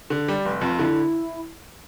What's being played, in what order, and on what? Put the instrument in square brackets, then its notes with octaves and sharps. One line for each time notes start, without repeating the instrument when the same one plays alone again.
[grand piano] D3
G3
F1
F2
[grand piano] D3 [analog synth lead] E4